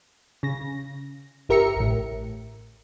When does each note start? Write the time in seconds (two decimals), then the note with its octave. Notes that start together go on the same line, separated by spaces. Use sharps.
0.43 C#3 A#6
1.49 G1 G4 A#4 E5 A#5 C#7
1.76 A1 A2